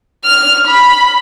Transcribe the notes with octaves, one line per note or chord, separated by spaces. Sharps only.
F6
B5